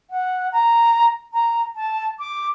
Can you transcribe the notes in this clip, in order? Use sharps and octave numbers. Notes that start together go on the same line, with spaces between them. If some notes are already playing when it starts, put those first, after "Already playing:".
F#5
A#5
A#5
A5
D6